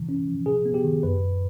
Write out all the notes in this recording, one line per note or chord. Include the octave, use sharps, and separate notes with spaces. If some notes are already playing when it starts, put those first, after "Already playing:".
Already playing: C3 E3
C#4
F3
C3 G#4
B3
G4
D#3
F#2 B4
F#2